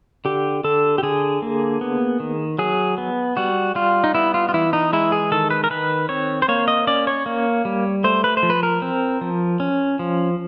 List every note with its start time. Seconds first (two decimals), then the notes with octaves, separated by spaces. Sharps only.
0.25 D3 G4
0.64 D3 A4
0.98 G4
1.03 D3 G#4
1.42 A#3
1.81 B3
2.20 D#3
2.59 F#3 G#4
2.98 B3
3.37 G3 F#4
3.75 G3 F4
4.04 D#4
4.14 B3 E4
4.34 F4
4.49 F4
4.54 E3 E4
4.73 D#4
4.93 G#3 E4
5.12 G#4
5.32 D#3 A4
5.50 B4
5.64 A#4
5.70 D#3 B4
6.09 C4 C#5
6.42 C5
6.48 A#3 C#5
6.68 D#5
6.87 C#4 D5
7.07 C#5
7.26 A#3
7.65 G3
8.04 A3 C5
8.24 B4
8.37 C5
8.43 F3
8.50 B4
8.63 A#4
8.82 C4
9.21 F3
9.60 C#4
9.99 F3